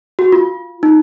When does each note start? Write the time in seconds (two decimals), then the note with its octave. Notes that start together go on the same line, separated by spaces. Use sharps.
0.19 F#4
0.32 F4
0.83 D#4